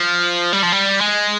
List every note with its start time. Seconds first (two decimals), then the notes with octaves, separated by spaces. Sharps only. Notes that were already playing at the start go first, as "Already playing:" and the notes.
Already playing: F3
0.53 G3
0.63 F3
0.72 G3
1.01 G#3